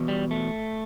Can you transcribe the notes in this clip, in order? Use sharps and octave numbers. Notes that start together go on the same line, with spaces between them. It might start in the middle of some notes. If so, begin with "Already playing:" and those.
Already playing: E2 B2
G3
A3